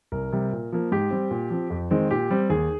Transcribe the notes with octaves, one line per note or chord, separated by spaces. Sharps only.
C2 A#4
C3 G3
A#2
F3 A#3
G#2 G4
G3 C4
A#2
F3 C4
F2
D#3 G#3 C4
A#2 G4
G3 C4
D#2 G#4